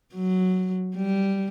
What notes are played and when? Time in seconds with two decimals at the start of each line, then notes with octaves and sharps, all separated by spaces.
0.14 F#3
0.96 G3